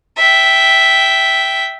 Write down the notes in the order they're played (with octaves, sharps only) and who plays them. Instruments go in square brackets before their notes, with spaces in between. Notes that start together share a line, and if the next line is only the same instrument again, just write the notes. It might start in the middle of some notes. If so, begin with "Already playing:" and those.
[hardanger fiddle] E5 G5